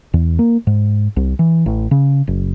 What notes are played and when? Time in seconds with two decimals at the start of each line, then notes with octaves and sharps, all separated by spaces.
0.14 E2
0.39 A#3
0.67 G#2
1.16 C2
1.39 E3
1.66 A1
1.91 C#3
2.27 F#1